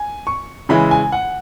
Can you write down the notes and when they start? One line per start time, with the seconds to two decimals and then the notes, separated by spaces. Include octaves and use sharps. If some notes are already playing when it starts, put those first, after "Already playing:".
Already playing: G#5
0.27 C#6
0.69 C#3 E3 G#3 E4 B5
0.91 G#5
1.12 F#5